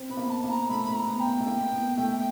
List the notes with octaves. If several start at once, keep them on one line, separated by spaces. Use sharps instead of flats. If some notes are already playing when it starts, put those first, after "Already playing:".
Already playing: C4
B3 B5
A#3
A5
A#3
A#5
A3 B5
A3
A#5
B3
G5
A#3
A3
A#3
B3
A3